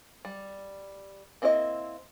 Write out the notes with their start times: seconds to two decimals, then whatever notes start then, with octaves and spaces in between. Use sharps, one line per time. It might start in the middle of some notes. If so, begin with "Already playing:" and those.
0.25 G3
1.42 A#3 C4 E4 G#4 D#5